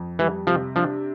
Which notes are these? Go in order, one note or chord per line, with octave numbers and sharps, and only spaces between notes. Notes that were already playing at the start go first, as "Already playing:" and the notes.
Already playing: F2
E3 G3
C3 F3
F3 D4